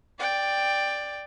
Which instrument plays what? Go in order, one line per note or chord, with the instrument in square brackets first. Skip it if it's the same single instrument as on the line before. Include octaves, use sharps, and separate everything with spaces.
[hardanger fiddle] D5 G5